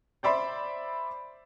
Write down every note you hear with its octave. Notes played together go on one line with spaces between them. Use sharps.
C5 D5 E5 B5 C6